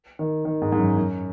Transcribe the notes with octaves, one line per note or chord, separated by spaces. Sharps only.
D#3
D#3
G#2
G#2
F#2
F#2